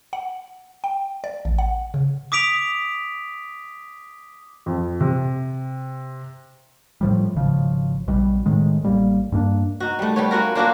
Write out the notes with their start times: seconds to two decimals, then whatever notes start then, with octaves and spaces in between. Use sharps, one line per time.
0.13 F#5
0.84 G5
1.24 D5
1.45 A1
1.58 F#5
1.94 C#3
2.32 D6 D#6 B6 D7 F7
4.66 F2
5.01 C3
7.01 A2 F3 G3
7.36 G#1 C#3 F3
8.07 A#1 B2 G3
8.46 A2 D#3 G#3
8.83 A1 G3 A#3
9.32 G2 A#3 D4
9.80 D#4 F#4
9.99 G3 A3
10.16 G3 B3 C#5
10.31 C#4 F4 F#4 A#4
10.55 A#3 D4 F4 F#4